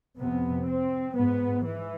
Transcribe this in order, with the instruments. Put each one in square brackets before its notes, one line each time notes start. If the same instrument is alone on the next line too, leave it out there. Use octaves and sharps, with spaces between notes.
[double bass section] F2 C3 B3
C4
G#2 B3
E3